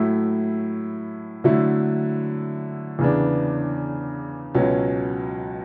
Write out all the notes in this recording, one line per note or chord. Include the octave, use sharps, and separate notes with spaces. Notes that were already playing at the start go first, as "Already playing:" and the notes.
Already playing: A2 F#3 A3 E4
D3 F#3 A3 E4
E2 C#3 E3 B3 D4
C#2 B2 F#3 C#4